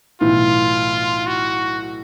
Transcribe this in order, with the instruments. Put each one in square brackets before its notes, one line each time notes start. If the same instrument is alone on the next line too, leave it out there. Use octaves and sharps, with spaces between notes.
[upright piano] B1 A2 E3 [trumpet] F4
[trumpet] F#4